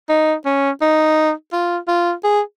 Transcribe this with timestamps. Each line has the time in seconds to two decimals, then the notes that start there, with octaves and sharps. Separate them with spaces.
0.09 D#4
0.45 C#4
0.81 D#4
1.53 F4
1.88 F4
2.24 G#4